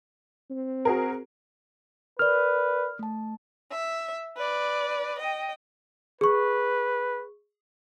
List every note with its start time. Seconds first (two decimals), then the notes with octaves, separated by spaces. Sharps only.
0.50 C4
0.85 F#4 G#4 A#4
2.19 A#4 B4 D5 F6
2.99 A3 A5
3.71 E5
4.37 B4 D5
5.19 D#5 G5
6.21 G#4 B4 C#6